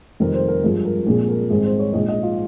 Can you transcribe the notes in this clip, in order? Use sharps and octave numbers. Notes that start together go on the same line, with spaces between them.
F1 F2 D#3 G3 C4 A#4
C5
A#4
G#1 G2 F3 G#4
A#4
A#1 A#2 F3 G#3 C4 G#4
A#4
G#1 G#2 G3 C4 G#4
C5
C#5
A#1 G#2 F3 D#5
D#5
F4